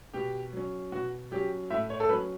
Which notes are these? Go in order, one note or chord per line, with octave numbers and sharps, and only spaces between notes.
B2 G4
F#3 C#4
B2 F#4
F#3 C#4 G4
A2 E5
C#5
A4
F#3 C#4 B4